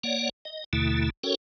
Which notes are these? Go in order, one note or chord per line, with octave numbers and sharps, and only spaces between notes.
A#3 C#5 D5 F#5
D#5
D#2 B2 D3 A3 E4
C#4 F#4 A4 A#4 C#5 G5